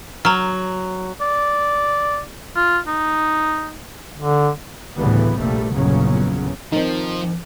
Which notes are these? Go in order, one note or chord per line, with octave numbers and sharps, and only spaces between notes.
F#3 A#5 F6
D5
F4
D#4
D3
D2 A2 C#3 E3 G3 B3
F1 A#1 A2 G3 A3 A#3
G1 E2 A#2 C#3 F#3 C#4
D#3 F3 C4 D#4